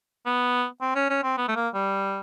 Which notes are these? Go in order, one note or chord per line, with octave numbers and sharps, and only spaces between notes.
B3
C4
C#4
C#4
C4
B3
A3
A#3
G3